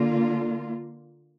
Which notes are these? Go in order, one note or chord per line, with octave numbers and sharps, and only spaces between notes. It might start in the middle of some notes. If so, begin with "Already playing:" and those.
Already playing: D3 A#3 F4